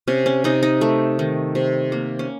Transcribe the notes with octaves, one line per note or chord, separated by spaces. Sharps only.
C3 C#4
C#4
C3 D#4
D#4
A3
D#3
C3
A#3
C#4